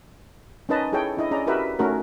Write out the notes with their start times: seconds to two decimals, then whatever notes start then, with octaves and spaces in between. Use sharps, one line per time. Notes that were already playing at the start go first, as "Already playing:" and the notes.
0.69 C#4 D#4 A#4 B4 D#5 A5
0.92 E4 G#4 A4 C#5 G5
1.17 D4 E4 D#5
1.31 C#4 G#4 D5 D#5 A#5
1.47 E4 F#4 G4 A#4 B4 E5
1.79 A3 C#4 D#4 F#4 A4 A#4